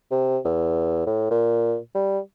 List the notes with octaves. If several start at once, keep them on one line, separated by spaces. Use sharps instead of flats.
C3
E2
A2
A#2
G3